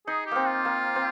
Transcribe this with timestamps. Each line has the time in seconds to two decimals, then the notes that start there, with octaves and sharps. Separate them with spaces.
0.07 D#4 G#4
0.26 G4
0.31 A#3 C4
0.46 F4
0.65 A#3
0.96 C4